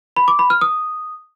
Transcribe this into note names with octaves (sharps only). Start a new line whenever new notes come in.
B5
D6
B5
F6
D#6